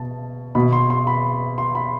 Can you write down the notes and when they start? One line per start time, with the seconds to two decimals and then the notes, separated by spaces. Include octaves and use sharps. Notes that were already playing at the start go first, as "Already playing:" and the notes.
Already playing: B2 A5
0.55 B2 B5
0.73 C6
0.90 C6
1.07 B5
1.58 C6
1.75 B5